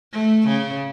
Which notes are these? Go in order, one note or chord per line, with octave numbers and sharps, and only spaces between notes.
A3
C#3